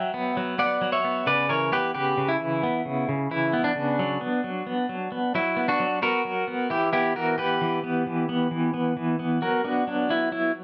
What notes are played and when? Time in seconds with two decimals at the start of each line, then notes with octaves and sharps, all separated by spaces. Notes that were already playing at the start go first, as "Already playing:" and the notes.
Already playing: F#3 E5 G5
0.14 B3
0.37 F#3
0.59 B3 D5 F#5
0.81 F#3
0.92 C#5 E5
1.04 B3
1.27 C#3 B4 D5
1.49 E3 A#4 C#5
1.72 B3 G4 B4
1.94 C#3 G4 B4
2.18 C#3
2.28 E4
2.40 E3
2.63 B3
2.85 C#3
3.09 C#3
3.31 E3 E4
3.53 B3
3.64 D4
3.75 C#3
3.99 F#3
4.21 B3
4.44 F#3
4.67 B3
4.89 F#3
5.12 B3
5.35 F#3 E4
5.57 B3
5.68 D4 F#4
5.80 F#3
6.02 B3 F#4 A#4
6.25 F#3
6.48 B3
6.70 E3 E4 G4
6.93 B3 E4 G4
7.16 E3 F#4 A#4
7.38 B3 G4 B4
7.61 E3
7.84 B3
8.07 E3
8.29 B3
8.51 E3
8.74 B3
8.97 E3
9.19 B3
9.42 F#3 F#4 A#4
9.64 B3 D4 F#4
9.87 F#3 D4
10.10 B3 E4
10.32 F#3 E4